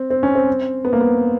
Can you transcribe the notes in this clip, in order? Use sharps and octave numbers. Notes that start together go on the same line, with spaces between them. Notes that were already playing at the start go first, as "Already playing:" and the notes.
Already playing: C4
C4
C#4
C4
B3
A#3
B3